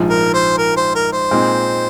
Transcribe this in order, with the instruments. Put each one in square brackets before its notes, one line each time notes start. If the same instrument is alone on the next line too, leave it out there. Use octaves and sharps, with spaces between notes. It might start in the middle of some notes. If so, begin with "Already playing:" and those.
Already playing: [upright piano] A#1 G#2 F3
[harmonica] A#4
C5
A#4
C5
A#4
C5
[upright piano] A#2 G#3 C4 D#4